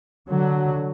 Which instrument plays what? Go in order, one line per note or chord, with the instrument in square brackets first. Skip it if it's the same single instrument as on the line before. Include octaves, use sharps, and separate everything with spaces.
[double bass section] D3 F#3